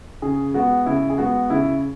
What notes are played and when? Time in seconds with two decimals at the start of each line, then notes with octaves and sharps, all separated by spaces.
0.22 C#3 G#4
0.54 G#3 B3 F#4
0.86 C#3 E4
1.10 G#4
1.18 G#3 B3 F#4
1.50 C#3 E4